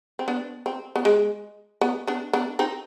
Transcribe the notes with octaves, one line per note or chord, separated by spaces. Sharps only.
C4
B3 D4
C4
B3
G#3
B3
B3 D4
B3 D4
C4 D#4